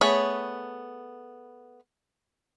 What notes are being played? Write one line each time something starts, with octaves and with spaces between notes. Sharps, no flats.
A3 B3 G#4 C#5 B5